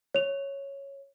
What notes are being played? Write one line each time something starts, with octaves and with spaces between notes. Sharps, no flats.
C#5 F7